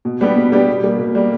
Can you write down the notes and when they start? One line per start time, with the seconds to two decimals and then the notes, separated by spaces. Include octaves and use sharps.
0.05 B2
0.21 G3 B3 D4 G4
0.36 B2
0.52 G3 B3 D4 G4
0.68 B2
0.83 G3 A#3
0.99 B2
1.15 G3 A#3